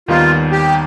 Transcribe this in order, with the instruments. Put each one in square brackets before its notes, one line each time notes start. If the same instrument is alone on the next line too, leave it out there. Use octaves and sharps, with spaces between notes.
[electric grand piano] D#2 D#3 G3 B3 D#4 [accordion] F4
[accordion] G4